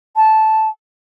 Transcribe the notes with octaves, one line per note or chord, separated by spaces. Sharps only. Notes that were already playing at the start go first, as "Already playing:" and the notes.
A5